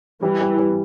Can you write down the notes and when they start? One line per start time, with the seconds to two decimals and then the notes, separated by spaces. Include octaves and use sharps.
0.22 E3 G3
0.41 G3
0.59 G3